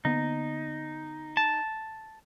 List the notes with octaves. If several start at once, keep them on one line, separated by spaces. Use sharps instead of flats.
D3 A#3 B3 D#4
A5